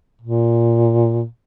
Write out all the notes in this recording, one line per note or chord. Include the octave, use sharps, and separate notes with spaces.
A#2